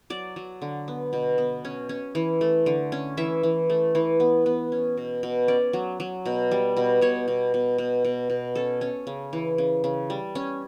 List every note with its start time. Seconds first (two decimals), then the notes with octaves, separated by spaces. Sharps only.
0.10 F#3 D5
0.36 F#3
0.62 D3
0.88 B3
1.13 B2
1.38 B3
1.65 C#4
1.89 C#4
2.15 E3
2.41 A3
2.66 D3
2.92 C#4
3.17 E3 E5
3.43 E3
3.70 A3
3.95 E3
4.20 B3
4.46 B3
4.72 C#4
4.97 B2
5.23 B2
5.48 C#4 D5
5.73 F#3
6.00 F#3
6.26 B2
6.51 G3
6.77 B2
7.01 B2 C#5
7.28 B2
7.54 B2
7.78 B2
8.05 B2
8.30 B2
8.55 C#4 A4
8.81 C#4
9.07 C#3
9.33 E3
9.58 C#3
9.84 C#3
10.10 G3
10.35 C#4